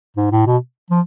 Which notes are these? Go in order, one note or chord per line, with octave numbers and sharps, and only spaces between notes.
G#2
A2
B2
F3